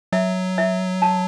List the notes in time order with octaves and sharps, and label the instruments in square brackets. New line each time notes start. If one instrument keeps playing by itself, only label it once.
[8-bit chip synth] F#3 [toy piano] E5
[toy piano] E5
A5